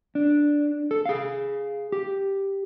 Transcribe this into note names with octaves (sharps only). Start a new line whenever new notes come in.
D4
A4
G#4 F5
G4